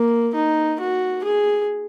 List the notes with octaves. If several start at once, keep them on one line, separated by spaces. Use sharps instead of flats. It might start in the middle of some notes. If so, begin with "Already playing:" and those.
Already playing: A#3
D#4
F#4
G#4